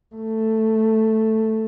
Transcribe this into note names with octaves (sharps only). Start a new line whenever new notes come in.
A3